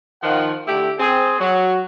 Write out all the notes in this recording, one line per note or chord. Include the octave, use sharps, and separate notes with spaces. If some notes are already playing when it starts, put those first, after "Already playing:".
D#3 F3 F#5
D3 A3 E4 G4
C4 G#4
F#3 F#4